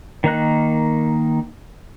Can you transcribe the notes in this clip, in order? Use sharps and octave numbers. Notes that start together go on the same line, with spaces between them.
D#3 A#3 D#4 F#6